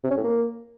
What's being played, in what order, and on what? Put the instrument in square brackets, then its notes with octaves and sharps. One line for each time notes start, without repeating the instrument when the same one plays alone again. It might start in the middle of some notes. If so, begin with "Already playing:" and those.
[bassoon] C3
C#4
A2
A#3